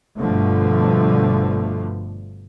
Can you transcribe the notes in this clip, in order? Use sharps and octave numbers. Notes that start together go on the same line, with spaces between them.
G1 G2 B2 D3 F3 A3